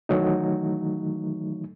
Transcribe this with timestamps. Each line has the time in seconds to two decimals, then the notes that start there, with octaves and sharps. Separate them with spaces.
0.09 D#3 E3 F#3 A3 D#4